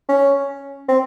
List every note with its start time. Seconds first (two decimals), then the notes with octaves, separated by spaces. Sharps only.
0.09 C#4
0.89 C4